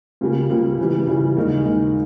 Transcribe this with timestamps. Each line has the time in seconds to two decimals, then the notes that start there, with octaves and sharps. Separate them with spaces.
0.21 C#2 C#3 G3 A#3
0.50 C#2 C#3 G3 A#3
0.78 C#3 E3 G3
1.07 C#3 E3 G3
1.36 D#2 C#3 G#3 D#4 A#4
1.65 D#2 C#3 G#3 D#4 A#4